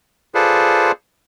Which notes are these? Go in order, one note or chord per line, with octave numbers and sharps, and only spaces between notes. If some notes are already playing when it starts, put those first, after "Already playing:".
F4 G#4 A4 B4 C5 D5